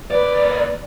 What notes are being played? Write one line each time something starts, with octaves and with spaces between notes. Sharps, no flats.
D#2 B4 D5